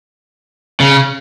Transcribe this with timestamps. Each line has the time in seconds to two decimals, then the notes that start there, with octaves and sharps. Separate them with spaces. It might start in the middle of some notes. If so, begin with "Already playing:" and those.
0.80 C#3